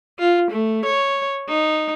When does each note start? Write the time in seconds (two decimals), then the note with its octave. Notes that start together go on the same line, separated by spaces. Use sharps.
0.19 F4
0.51 A3
0.85 C#5
1.48 D#4